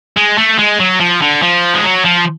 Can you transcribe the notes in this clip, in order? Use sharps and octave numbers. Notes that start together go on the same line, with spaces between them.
G#3
A3
G#3
F#3
F3
D3
F3
G#3
F#3
F3